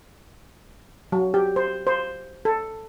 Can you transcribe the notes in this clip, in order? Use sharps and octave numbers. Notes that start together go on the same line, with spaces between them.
F#3
G4
C5
C5
A4